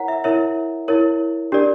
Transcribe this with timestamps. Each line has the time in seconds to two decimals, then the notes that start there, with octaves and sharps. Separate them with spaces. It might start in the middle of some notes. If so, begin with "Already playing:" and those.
Already playing: E4 A#4 C#5 F#5 A#5
0.08 E5
0.24 E4 A#4 C#5 E5
0.88 E4 A#4 C#5
1.52 D4 G4 A#4 D5